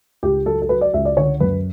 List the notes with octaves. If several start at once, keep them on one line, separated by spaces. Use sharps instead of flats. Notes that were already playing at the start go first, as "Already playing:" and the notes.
C#2 G4
F#3 A4
A4
F#3 B4
D5
C#2 E5
D5
D3 C#5
F#2 B4